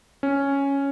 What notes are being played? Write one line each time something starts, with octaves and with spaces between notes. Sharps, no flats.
C#4